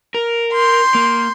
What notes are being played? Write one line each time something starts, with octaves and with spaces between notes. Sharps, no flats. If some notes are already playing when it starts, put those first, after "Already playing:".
A#4
C6 G6
A#3